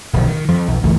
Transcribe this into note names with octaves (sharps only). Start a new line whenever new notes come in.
D1 B1 B2 F3
D#3
F2 F3
B1
G1 C#2 E3 A3